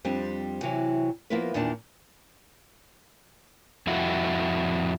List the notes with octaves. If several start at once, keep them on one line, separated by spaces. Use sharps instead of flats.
F2 G3 C4 D4
C3 E3 F#3
F3 A#3 B3 E4 A#4 B4
E2 A#2 D#3 D4 A5
F2 E4 F#4